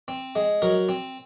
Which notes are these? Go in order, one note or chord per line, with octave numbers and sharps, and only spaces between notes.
C4
G#3
F#3 A#4
C4